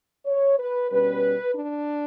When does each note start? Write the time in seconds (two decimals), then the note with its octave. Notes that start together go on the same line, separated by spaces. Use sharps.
0.26 C#5
0.58 B4
0.90 B2 G3 C#4 B4
1.55 D4